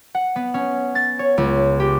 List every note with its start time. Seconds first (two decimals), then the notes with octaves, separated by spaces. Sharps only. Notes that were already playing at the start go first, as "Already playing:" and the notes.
0.15 F#5
0.36 B3
0.54 C#4
0.95 A6
1.19 C#5
1.38 C#2
1.80 G4